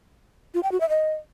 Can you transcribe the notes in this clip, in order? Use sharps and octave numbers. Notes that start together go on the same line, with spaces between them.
F4
G5
F#4
E5
D#5